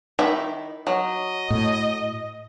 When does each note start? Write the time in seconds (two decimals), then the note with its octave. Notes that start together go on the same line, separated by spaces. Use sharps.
0.19 D#3 E4 E5
0.87 F#3 D#5
1.50 A2